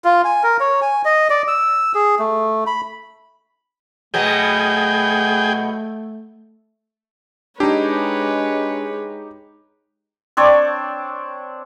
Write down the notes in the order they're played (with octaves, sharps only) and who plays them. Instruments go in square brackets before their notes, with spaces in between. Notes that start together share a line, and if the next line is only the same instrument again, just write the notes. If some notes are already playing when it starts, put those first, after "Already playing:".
[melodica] F4
G#5
A#4
C#5
G#5
D#5
D5
E6
G#4
A3
B5
[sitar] B2 F#3 B3 [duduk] A3 [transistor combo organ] G#4 G5
[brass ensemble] G#3 [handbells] D4 [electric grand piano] D#4 G4 [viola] B4 C#5
[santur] C4 D4 C#5 D5